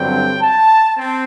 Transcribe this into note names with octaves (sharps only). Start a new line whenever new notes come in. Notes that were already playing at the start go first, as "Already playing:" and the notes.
Already playing: G2 D3 F#3 C4 G5
A5
C4